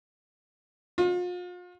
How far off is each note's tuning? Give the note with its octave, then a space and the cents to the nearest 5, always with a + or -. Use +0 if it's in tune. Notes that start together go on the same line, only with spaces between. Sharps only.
F4 +40